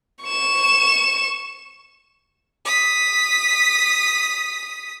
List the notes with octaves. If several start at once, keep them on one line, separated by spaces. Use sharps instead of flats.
C#6 E7
D#6 B6